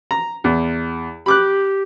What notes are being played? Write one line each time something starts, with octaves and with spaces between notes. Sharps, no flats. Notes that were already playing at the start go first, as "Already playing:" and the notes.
A#5
E2
G4 B5 D6 F#6